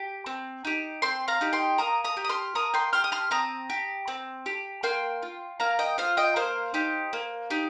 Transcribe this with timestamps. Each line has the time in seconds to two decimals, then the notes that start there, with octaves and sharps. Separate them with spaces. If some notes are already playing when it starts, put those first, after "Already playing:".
Already playing: G4
0.26 C4
0.65 D#4 G4
1.02 C4 G5 C6
1.28 F5 A#5
1.41 D#4 G4
1.53 G5 C6
1.78 A#3 A#5 D#6
2.04 A#5 D#6
2.17 G4
2.24 D#6
2.29 C6 F6
2.55 A#3 A#5 D#6
2.74 G5 C6
2.93 G4 C6 F6
3.04 D#6
3.12 C6 F6
3.31 C4 A#5 D#6
3.70 G4
4.08 C4
4.46 G4
4.83 A#3 G5 C6
5.22 F4
5.60 A#3 F5 A#5
5.79 D#5 G5
5.98 F4 C5 F5
6.17 D#5 G5
6.36 A#3 C5 F5
6.74 D#4 G4
7.13 A#3
7.50 D#4 G4